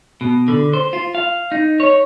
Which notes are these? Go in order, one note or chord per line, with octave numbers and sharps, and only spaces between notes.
B2
D3
C5
F4
F5
D#4
C#5